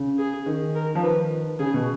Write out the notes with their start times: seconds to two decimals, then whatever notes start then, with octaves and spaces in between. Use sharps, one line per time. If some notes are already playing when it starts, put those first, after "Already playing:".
Already playing: C#3
0.18 G#4
0.46 D#3
0.75 A#4
0.95 F3
1.02 D#3 B4
1.59 C#3 G#4
1.74 B2